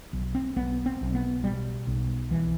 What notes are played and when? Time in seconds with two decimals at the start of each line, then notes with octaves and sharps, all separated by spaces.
0.13 B1
0.35 C4
0.56 B1 B3
0.86 C4
1.01 B1
1.15 B3
1.43 B2 G3
1.87 B1
2.31 C2 E3